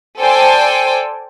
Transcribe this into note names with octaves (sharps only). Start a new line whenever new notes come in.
A4 C5 D5 G5 G#5